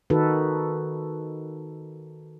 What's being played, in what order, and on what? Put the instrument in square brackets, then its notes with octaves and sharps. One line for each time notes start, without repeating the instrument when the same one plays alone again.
[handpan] D#3 D#4 F#4 A4 B4